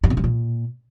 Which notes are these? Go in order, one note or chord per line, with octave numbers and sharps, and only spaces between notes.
G2
B2
G2
A#2